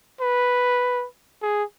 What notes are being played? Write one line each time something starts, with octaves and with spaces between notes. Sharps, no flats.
B4
G#4